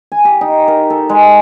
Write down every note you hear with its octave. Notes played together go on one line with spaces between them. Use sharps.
G#5
G4
D#4
A#4
A4
G#3